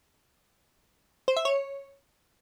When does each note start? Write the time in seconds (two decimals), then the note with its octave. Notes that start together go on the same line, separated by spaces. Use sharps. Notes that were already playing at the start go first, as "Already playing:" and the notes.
1.28 C5
1.37 E5
1.45 C#5